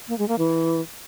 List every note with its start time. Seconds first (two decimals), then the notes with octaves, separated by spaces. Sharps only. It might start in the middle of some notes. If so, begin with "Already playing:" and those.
0.08 A#3
0.18 G#3
0.28 A#3
0.39 E3